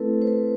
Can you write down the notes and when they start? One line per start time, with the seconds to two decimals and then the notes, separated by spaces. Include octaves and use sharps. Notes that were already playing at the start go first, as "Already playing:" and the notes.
Already playing: A3 C4 E4 A4 B4
0.22 C5
0.27 B4